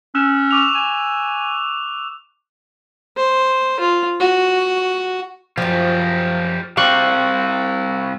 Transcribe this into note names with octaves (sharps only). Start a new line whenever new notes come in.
C#4 E6 F#6 E7
C#6 D6 F7
G#5
C5
F4
F#4
F#2 F3 F4 G4
G3 C4 G4 F5 C#6 F#6